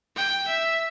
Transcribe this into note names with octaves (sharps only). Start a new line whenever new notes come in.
G5
E5